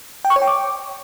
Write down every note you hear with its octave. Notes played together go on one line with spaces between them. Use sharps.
G5
C#6
C#5
G5
D6